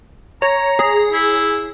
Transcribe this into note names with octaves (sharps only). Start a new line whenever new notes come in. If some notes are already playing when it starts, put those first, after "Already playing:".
C#5 A#5
G#4
E4